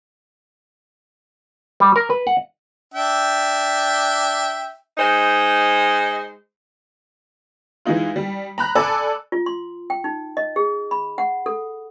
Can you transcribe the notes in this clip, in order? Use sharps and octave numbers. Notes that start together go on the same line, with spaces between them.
G3
A#4
B4
F#5
D4 E5 G5
G#3 D#4 C5
E3 G#3 D#4 F4
G3
A#5 B5 F#6
A4 D5 G#5 B5 D6 E6
F4
C6
G5
D#4
D#5
G#4
B5
F#5
A4